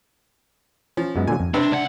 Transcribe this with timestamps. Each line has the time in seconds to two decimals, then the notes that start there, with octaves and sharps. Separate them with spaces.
0.97 F3 C#4
1.16 F#2 G#3 B3
1.27 A#2 D3 F#3 G#5
1.40 F2
1.54 C3 C4 D4 B4 G5
1.72 C#2 D4 F#5